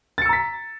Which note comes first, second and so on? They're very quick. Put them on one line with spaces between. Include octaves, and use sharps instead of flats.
A6 C#7 E6 A#5 B6